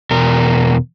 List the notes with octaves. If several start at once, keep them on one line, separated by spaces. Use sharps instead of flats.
E2 B2 A#4